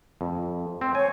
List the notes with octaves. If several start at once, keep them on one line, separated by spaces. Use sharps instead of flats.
F2
C4
C#5 G#5